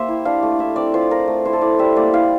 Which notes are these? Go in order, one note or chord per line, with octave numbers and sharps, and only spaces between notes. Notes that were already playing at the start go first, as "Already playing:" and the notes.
Already playing: A#3 G4 C5 E5
E4
D4 F5
A3
E4 E5
C4 D5
F4 C5
F4 A#4
A3
E4 C5
A4
E4 D5
G3 E5
A#3 D5
E4 F5